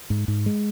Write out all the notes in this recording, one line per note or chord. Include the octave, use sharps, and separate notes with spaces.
G#2
G#2
G#3